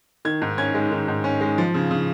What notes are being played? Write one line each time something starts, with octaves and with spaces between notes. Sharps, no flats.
D#3 G#6
G#2
C#4 G#6
G#3
D#3
G#2
C#4
G#3
F3
C#3
C#3